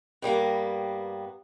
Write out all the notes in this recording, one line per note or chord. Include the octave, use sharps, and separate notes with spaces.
G2 G3 A#3 B3